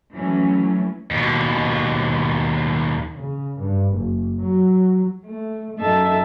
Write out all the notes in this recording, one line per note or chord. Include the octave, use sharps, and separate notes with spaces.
E3 F#3 A3 C#4
D#2 B2
C#3
G2
F#1
F#3
A3
F#2 D#4 A4 E5 A5 A6